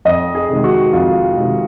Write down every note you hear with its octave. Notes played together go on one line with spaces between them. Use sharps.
F2 D#5
G#4
C3 D#3 G#3
F#4
F2 F4
C3 D#3 G#3